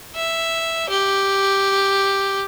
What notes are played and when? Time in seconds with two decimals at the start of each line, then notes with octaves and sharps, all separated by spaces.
0.15 E5
0.89 G4